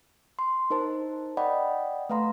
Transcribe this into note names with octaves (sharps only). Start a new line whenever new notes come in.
C6
D#4 A#4 C5 A5
D5 D#5 F#5 G5 B5
A3 B4 F5 A#5 C6